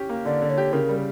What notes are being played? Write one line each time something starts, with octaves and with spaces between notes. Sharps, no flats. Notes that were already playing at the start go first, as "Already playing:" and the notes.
Already playing: C#4 G4
A#3
D3 D5
D3
C#5
G4
C#3 A#4
G3